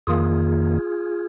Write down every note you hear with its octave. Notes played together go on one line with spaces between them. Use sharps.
F2 D#3 A#3 F4 G#4